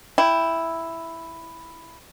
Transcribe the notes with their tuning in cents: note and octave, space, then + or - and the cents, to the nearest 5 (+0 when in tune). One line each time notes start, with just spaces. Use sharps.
E4 +0 G5 +5